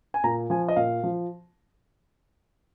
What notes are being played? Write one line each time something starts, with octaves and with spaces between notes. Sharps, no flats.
G#5
A#2 A#5
F3 G#5
D#5
A#2 F5
F3